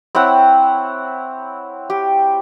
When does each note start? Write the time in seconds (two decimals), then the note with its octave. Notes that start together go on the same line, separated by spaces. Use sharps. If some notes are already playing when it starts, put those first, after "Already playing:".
0.15 C4 E4 C#5 F#5
1.90 G4